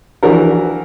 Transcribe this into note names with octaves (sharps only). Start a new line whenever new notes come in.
E3 F3 D4 F#4 A#4